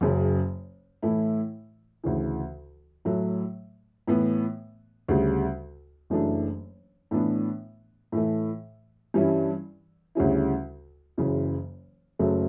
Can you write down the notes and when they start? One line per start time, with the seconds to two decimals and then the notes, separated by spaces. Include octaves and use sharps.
0.01 F#1 F#2 C#3
1.03 A2 E3 A3 E4
2.04 D2 C#3 E3
3.05 A2 F#3 A3
4.07 A2 E3 B3
5.08 D2 C#3 G3
6.10 F#1 F#2 E3 A3 D4
7.11 A2 E3 B3 D4
8.12 A2 E3 A3
9.14 G2 E3 G3 C#4 E4
10.15 D2 C#3 G3 C#4 E4
11.18 F#1 F#2 C#3 E3
12.19 F#1 F#2 C#3 F#3 A3